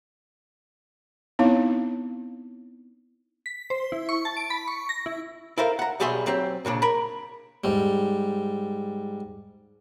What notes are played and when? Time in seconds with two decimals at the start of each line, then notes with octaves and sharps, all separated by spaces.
1.39 B3 C4 D#4 E4 C#5 F5
3.46 B6
3.70 C5
3.92 E4
4.09 C#6
4.25 A5
4.37 D7
4.50 B5
4.68 C#6
4.89 A#6
5.06 E4
5.58 E4 A4 A#4 C5 F5
5.79 F#5 A#5
6.00 B1 B2 G3 G#4 E5 C6
6.26 F#3 C4 G4 C5
6.65 C2 A#2 C#3 D4
6.82 A#4 A#5 B5
7.64 G#2 G3